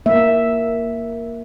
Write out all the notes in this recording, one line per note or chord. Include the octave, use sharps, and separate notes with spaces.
A#3 E5